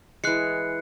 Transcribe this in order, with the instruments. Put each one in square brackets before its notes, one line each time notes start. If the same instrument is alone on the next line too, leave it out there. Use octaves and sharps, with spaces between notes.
[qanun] E3 G#3 [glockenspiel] F#6 C7 C#7